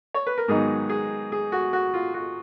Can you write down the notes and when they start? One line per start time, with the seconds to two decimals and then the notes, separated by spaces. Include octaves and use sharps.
0.14 C#5
0.27 B4
0.38 A#4
0.48 G#2 D#3 F#3 B3 D#4 G#4
0.89 G#4
1.32 G#4
1.52 F#4
1.73 F#4
1.94 F4
2.14 F#4